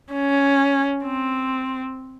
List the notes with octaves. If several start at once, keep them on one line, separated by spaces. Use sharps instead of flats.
C#4
C4